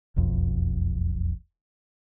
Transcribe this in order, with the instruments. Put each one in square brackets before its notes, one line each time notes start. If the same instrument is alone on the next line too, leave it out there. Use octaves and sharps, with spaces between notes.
[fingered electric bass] E1 B1 F2